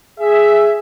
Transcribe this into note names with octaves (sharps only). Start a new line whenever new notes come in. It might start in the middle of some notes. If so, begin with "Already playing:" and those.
G#4 E5